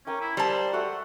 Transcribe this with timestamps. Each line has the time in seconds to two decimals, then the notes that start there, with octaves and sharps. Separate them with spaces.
0.07 C#4 A#4 G5 D6
0.21 E4
0.37 G3 C5 A5
0.73 A3 F#4 F#5